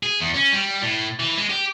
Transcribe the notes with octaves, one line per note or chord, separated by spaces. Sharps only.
G#4
E2
C#4
G3
A2
E3
G#3
G4